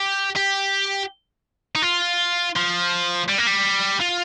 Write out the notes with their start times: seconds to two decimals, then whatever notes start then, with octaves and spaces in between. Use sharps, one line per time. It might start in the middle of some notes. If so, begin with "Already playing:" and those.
Already playing: G4
0.36 G4
1.76 D#4
1.82 F4
2.56 F3
3.28 G3
3.38 A#3
3.47 G3
4.01 F4